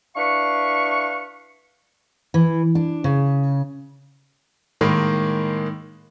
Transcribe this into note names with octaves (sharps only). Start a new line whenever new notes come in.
D4 E4 B4 F5 C#6
E3
D4
C#3
A2 D#3 G#3 A#3